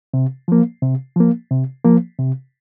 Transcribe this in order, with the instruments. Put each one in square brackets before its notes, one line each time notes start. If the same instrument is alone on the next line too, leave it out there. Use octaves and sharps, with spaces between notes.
[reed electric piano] C3
F3 A#3
C3
F3 A#3
C3
F3 A#3
C3